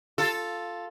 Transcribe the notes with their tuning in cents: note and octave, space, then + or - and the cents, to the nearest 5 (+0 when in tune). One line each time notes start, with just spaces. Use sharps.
F4 +0 A4 +0